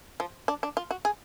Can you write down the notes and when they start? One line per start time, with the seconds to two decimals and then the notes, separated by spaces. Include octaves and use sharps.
0.20 F3
0.48 D4
0.63 D4
0.77 F4
0.91 F#4
1.05 G#4